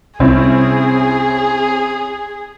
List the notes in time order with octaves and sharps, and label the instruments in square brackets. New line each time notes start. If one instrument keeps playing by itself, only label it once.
[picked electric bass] C2 [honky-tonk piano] C4 C#4 E4 [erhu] G#4